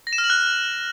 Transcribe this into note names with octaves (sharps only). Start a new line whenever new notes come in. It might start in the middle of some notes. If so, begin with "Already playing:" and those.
A#6
E7
F6
F#7
F#6